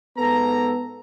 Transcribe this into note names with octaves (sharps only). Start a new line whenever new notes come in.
G#2 B3 A4 A#5